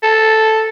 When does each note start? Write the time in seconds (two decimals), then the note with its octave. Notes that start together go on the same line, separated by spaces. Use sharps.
0.03 A4